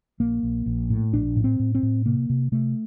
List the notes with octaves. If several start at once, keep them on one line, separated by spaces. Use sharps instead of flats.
A#1 A#3
A#1
A#1
A2
A#1 D4
A2
C4
A2
C4
A2
C3 A#3
C3
C3 A3